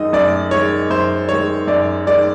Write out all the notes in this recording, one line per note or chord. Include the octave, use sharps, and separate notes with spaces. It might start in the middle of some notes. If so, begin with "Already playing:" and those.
Already playing: F#2 D#3 G#3 D#5
F#2 D5
D#3 G#3 C#5
F#2 C5
D#3 G#3 C#5
F#2 D5
D#3 G#3 D5